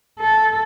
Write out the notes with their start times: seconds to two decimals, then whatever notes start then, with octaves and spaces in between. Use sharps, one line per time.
0.20 A4